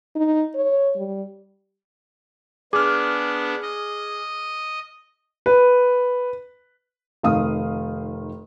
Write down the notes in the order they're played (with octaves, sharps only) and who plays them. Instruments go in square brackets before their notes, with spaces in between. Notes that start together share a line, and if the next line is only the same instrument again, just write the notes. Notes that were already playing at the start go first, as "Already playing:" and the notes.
[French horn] D#4
C#5
G3
[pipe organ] B3 D4 [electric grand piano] G#4 F6 [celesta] D6
[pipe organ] D#5
[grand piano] B4
[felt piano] F1 D#3 F5 D#6